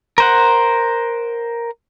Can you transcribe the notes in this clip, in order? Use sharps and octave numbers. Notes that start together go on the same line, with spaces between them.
A#4 C5 F#5